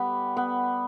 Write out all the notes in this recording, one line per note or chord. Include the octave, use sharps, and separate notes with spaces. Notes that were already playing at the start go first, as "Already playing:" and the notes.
Already playing: G3 B3 G4
B3